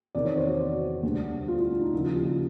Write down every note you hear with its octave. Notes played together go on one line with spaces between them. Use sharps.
E2 C3 D#3 D5
C#5
C5
F#4
D2 D3 G3 B3
F4
E4
D4
D#4
D#2 C#3 F3 A#3 E4
F4
G4
E4